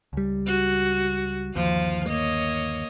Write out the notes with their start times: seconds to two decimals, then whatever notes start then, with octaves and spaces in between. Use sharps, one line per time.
0.13 C#2 G3
0.47 F#4
1.55 G1 D#2 F3 F4
2.09 A#3 C#5 D#5